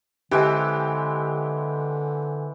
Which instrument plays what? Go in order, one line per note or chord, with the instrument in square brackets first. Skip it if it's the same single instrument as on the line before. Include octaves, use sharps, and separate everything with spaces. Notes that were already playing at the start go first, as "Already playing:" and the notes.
[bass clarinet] D3 [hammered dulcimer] E3 G#3 C4 [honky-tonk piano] G4